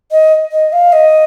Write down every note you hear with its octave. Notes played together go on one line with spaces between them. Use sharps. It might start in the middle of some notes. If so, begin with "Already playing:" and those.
D#5
D#5
F5
D#5